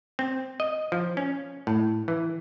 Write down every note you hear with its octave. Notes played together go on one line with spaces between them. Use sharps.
C4
D#5
F3
C#4
A2
E3